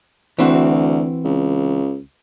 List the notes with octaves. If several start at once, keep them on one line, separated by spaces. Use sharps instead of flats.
D2 E3 C4 F#4
C#2